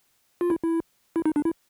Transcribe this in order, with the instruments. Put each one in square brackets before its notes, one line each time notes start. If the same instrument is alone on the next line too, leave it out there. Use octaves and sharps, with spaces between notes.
[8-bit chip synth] F4
E4
E4
E4
D#4
D4
E4